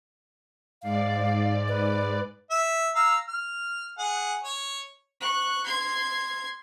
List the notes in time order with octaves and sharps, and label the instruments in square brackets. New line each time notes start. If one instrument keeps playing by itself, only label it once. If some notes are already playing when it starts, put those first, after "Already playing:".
[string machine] G#2 D5 [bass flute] F5
[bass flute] B4
[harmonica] E5
F5 A#5 E6
F6
G#4 F#5
C#5
[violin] C#6 F#6
C6 G#6